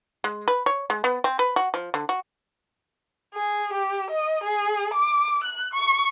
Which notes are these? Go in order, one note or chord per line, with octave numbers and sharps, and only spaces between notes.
G#3
B4
C#5
G#3
B3
C4
B4
F#4
F3
D3
F#4
G#4
G4
D#5
G#4
D6
F#6
C#6